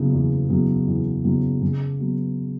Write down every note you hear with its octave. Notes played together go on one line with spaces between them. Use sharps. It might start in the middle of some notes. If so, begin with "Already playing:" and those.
Already playing: C#3 F#3 B3 E4
E2
C#3 F#3 B3 E4
E2
C#3 F#3 B3 E4
C#3
F#3 B3